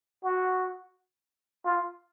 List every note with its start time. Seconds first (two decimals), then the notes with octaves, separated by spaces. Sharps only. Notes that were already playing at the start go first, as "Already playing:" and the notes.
0.24 F#4
1.65 F4